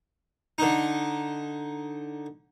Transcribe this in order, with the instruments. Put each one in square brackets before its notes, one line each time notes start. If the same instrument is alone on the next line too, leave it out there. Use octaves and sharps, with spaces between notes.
[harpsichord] D3 D#4